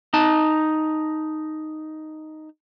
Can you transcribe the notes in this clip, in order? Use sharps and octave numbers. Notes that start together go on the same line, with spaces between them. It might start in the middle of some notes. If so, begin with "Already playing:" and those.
D#4 A5